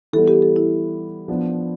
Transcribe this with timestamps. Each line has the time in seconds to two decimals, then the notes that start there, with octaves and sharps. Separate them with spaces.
0.13 E3 G3 B3 A4
0.28 G4
0.42 A4
0.56 E4
1.28 F3 B3 D4